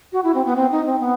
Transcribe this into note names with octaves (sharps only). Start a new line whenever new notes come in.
F#4
E4
C4
B3
C4
D#4
C4
B3